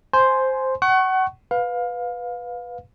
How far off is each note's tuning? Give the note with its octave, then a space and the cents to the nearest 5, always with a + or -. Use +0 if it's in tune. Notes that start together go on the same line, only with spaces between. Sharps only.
C5 +0 G#5 +15 C6 +0
F#5 +30 C#6 -15
B4 +0 F5 +25